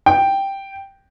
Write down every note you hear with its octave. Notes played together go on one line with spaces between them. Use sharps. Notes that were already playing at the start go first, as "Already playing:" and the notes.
G5